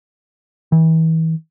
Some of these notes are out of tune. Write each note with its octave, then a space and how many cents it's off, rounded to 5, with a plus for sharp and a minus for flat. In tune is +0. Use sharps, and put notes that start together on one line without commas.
E3 -35